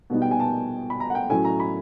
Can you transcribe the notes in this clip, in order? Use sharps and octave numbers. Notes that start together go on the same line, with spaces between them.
B2 G3 B3 D#4
G5
G#5
A5
B5
A#5
F#5
G5
A2 F#3 A3 C#4 G#5
A#5
B5